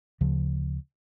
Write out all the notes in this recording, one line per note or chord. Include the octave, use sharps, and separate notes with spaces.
D2 C#3 F3